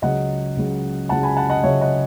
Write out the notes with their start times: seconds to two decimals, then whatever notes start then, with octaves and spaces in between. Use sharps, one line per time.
0.02 C#2 C#3 F#3 D#5 F#5
0.56 C#2 C#3 F#3
1.09 C#2 C#3 F#3 F#5 A5
1.23 G#5 B5
1.36 F#5 A5
1.50 D#5 F#5
1.63 C#2 C#3 F#3 C#5 E5
1.81 D#5 F#5